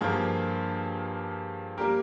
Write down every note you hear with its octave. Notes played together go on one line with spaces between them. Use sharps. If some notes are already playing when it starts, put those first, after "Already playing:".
G2 F3 A#3 F4 G#4
G3 A#3 G4 A#4